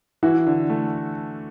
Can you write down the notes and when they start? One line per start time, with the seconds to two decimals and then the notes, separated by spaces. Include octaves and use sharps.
0.23 E3 E4 F#4
0.47 D3
0.70 A3